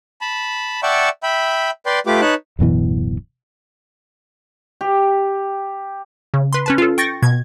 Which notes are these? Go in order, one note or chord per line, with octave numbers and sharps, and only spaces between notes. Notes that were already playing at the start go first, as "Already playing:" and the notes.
A5 B5
D5 E5 F#5 G5 A5 C#6
E5 G5 B5
B4 D5 G5 C6
A3 F4 G4 B4 D6
D#4 B4 C#5 A5 F#6
D1 F#2 B2 E3
G4
C#3
B4 C6
C#4 B4 A5
F4 A4
G5 C#6 A6 A#6
B2 G#6